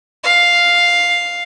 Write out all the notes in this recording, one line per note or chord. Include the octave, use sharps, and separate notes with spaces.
F5